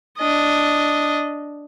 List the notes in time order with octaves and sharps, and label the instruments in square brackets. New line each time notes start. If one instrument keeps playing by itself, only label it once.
[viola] D4 D#5